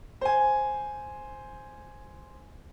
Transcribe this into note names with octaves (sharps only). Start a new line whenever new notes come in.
C5 G#5